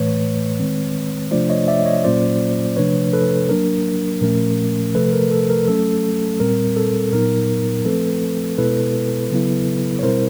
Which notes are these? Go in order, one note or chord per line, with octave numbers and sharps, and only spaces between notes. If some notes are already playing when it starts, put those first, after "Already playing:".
Already playing: A2 E3 A3 B4 C#5
D#3 G#3 C4
C3 F3 A3 D4 F4 C5 D5
C#5 D#5
D5 E5
C#5 D#5
A#2 F#3 A#3 C#4 F4 C5 D5
C3 F3 A3 D4 B4 C#5
A4 B4
F#3 A#3 D4 A#4
A#2 F3 A3 C#4 A#4
C3 F3 A3 A4 B4
A#4
A4
A#4
F#3 A3 C#4 A4
A#2 G3 C4 A#4
A4
A#2 F#3 B3 D#4 A#4
F3 A3 C4 A4 B4
B2 G#3 B3 E4 A4 B4
C#3 F#3 B3 E4
C#5
B2 G3 C4 E4 A#4 C5